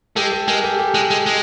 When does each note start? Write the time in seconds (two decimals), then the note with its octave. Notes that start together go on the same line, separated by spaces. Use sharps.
0.16 G#3 G4 A4
0.32 G4 A4
0.48 G#3 G#4 A#4
0.63 G4 A4
0.79 G4 A4
0.94 G#3
1.11 G#3
1.26 G#3